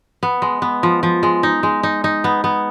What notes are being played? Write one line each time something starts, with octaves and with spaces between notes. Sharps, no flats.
B3
G#3
B3
F3
F3
G#3
D#4
G#3
D#4
D#4
B3
B3